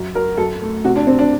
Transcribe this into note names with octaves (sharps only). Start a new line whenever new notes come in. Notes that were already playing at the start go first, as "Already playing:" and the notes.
Already playing: F#2
F#3 A#4
F#2 A4
A3
C3 F#4
D4
C3 C4
D4